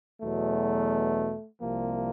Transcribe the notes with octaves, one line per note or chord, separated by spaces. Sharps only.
E2 B2 F#3 A3
C2 C3 F3 A#3